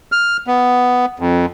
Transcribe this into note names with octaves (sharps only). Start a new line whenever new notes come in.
F6
B3
F2